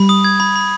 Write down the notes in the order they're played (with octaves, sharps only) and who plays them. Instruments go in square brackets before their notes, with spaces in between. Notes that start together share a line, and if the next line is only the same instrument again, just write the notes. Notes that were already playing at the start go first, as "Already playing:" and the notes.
Already playing: [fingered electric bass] G3 [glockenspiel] B5
[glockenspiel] D#6
G#6
B5
B5